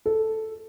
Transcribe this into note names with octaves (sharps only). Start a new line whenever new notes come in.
A4